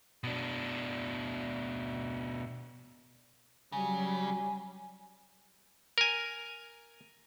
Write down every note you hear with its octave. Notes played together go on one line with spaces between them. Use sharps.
B2 D4
C#3 F#3 G3 G#5
A#4 G#5